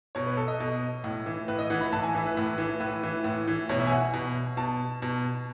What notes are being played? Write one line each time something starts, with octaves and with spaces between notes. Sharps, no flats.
B2 C#5
B4
A4
D#5
B2
A2
E3
A2 B4
D#5
E3 F#5
B5
A2 A5
G#5
E3 E5
B4
A2
E3
A2 B4
E3
A2
E3
B2 C#5
E5
G#5
F#5
B2
B2 A5
B2